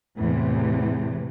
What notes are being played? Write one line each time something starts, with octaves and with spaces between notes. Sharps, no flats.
E2 A2 C3 E3